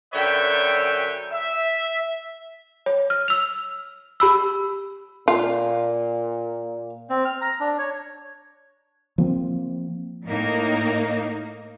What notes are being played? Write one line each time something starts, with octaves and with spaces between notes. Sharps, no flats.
F#2 D3 B4 C#5 E5 G5
E5
C#5
F6
E6 F7
G4 B5 E6
A#2 F4
C4
F6
A#5
D4
C#5
F3 A#3 C4
A2 A#3 D#4